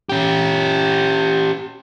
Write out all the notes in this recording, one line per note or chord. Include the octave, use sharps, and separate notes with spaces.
C#4 G4